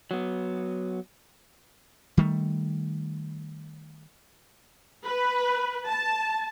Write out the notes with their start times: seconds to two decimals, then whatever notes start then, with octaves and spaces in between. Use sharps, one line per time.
0.11 F#3 B3
2.17 D#3 G3 A3
5.05 B4
5.88 A5